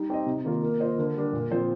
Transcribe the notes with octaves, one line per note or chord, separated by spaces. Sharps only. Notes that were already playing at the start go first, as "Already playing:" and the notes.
Already playing: G3 D#4
C4 G4 C5 D#5
C3
D#3 A#3 F4 A#4
A#3 A#4
F4 C5 D#5
D3
G3 D4
A#2
F3 C4 F4 C5